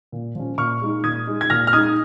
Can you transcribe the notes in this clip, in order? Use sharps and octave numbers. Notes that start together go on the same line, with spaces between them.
A#2
F3 C#4
A#2 C#6 F6
G#3 D#4
A#2 D#6 G#6
G#3 D#4
G#6
A#2 F6 A#6
F6
G#3 D#4 D#6 G#6